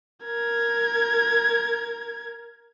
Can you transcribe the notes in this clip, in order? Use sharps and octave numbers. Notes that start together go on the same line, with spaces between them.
A#4 G#6